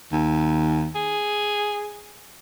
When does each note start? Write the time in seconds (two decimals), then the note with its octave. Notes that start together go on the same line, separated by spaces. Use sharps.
0.12 D#2
0.95 G#4